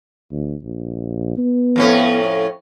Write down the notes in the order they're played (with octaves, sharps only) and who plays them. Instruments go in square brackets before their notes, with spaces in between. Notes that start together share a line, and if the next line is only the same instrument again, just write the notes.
[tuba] D2
A#1
B3
[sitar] F2 A2 C#4